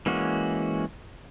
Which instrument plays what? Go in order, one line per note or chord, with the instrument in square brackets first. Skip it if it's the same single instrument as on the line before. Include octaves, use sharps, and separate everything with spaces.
[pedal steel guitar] E3 G#3 A#3 C#4 F#4